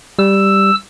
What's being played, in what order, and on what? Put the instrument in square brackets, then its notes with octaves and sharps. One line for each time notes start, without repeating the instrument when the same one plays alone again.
[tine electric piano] G3 [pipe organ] E6